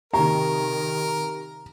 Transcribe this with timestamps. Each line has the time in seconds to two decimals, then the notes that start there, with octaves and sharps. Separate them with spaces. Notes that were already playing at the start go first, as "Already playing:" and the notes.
0.14 C3 D#3 D#4 G4 A#4 A#5